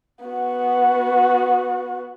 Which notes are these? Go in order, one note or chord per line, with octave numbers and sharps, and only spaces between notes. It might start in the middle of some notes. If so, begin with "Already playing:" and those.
B3 F#4